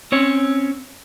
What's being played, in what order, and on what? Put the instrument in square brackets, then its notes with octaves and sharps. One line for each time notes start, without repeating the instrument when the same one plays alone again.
[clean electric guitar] C4 C#4 C#5